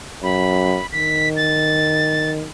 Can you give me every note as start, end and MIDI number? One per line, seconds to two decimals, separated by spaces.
0.23 0.79 42
0.23 0.87 83
0.92 2.46 51
0.92 1.29 95
1.36 2.30 93